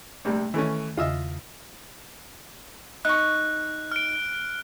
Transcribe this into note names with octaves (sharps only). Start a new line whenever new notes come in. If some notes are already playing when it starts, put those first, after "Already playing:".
A#1 C3 G3 A3
D#3 E3 A3 C#4
E2 C#3 F4 D#5 E5
D#4 C#6 F#6
F6 D7